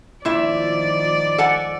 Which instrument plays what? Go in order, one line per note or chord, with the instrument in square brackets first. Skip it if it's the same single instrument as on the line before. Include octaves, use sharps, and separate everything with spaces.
[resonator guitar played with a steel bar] A#2 E4 E5 [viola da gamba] D#3 F3 D5
[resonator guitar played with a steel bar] A4 F#5 G#5